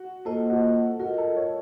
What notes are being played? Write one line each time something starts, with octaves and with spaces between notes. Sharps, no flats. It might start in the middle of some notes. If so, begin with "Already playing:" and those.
Already playing: F#4
A#3 F4 A4 C5 D#5
F#4
F4 F#4 A#4 D#5
A4
C#5